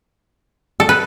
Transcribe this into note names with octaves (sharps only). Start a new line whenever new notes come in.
A4
B4